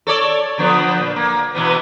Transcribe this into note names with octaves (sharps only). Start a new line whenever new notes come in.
A4 C#5 D5
D3 F3 B3
A#2
A#3
B2 E3 B3